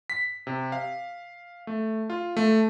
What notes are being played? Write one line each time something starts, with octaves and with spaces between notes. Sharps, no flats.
B6
C3
F5
A3
F4
A3